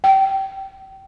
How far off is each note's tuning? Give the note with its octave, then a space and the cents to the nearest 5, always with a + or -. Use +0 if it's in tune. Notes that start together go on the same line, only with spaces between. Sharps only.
G5 -20